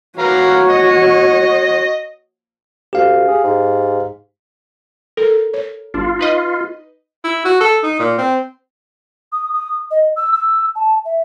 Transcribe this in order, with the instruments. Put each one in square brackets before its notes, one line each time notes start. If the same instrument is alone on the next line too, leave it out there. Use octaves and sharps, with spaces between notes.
[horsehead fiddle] F#4 C#5 [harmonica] B4 F5 A#5
[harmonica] D#5
[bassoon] D2 [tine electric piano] G4 F5
[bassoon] G#4
G#2
[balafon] A4 [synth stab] A#4
[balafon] C#5
[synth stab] G1 D4 [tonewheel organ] F4
[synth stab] D#4 B4 D#5
[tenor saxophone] E4
F#4
A4
D#4
A#2
C4
[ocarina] D#6
D#6
D#5
E6
E6
A5
E5